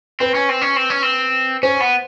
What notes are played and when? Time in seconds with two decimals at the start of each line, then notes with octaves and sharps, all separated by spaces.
0.20 C4 B4
0.35 C#4
0.49 C4
0.62 C#4
0.76 C4
0.90 C#4
1.03 C4
1.63 C#4 C5
1.80 B3